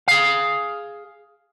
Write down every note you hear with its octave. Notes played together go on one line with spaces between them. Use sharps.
G#4 F5